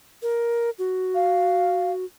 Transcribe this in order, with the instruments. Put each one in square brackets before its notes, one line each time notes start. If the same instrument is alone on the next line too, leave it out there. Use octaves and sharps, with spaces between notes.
[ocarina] A#4
F#4
[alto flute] F5